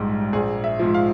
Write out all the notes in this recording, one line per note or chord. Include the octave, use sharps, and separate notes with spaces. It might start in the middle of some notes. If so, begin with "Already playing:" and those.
Already playing: A#1 G#2 G3
A#1 G#4
E5
G#2 F3
F5